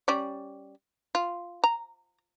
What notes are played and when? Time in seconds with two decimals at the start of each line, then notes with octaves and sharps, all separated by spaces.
0.08 G3 C#4 D5
1.15 F4
1.64 A#5